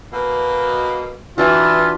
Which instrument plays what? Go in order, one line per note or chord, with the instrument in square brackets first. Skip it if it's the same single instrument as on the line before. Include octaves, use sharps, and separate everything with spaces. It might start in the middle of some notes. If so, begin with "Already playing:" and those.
[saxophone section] B2 A#3
[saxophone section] E3 [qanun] D4 F#4 [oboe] F4